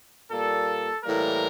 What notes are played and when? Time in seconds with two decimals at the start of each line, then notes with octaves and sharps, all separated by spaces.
0.31 A#2 G3 A#3 A4
1.04 A2 E3 G3 A#3 A#4